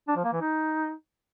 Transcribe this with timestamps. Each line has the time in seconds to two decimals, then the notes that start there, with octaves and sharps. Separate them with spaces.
0.08 D4
0.16 F3
0.24 A#3
0.32 E3
0.41 D#4